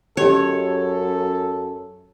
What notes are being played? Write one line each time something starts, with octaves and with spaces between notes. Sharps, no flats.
F#2 C#4 G4 A4 C#5 D#5